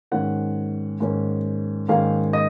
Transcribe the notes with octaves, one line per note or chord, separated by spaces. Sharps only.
G#2 D#3 A#3 C#4 F#5
G#2 D#3 A#3 C#4
G#2 D#3 A#3 C#4 F5
D#5